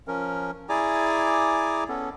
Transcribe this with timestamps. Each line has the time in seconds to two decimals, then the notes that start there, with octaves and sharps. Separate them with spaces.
0.08 F3 C#4 A#4
0.69 E4 G#4 D5 G#5 A#5 D6
1.89 B3 C#4 A4